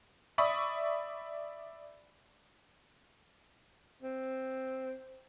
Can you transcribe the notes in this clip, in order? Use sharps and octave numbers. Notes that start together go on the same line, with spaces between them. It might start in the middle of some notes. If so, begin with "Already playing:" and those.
D5 E5 B5 C#6 D#6
C4